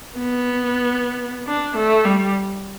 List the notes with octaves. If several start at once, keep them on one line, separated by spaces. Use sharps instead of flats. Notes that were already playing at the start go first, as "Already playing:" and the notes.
B3
D4
A3
G3